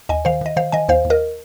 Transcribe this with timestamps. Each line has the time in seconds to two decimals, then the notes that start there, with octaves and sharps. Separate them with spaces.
0.09 D#2 D#5 G#5
0.25 D#3 C5 F5
0.41 D#3 D#5
0.56 D#3 C5 F5
0.72 D#3 D#5 G#5
0.89 D#2 C5 F5
1.05 D#2
1.10 A#4 D#5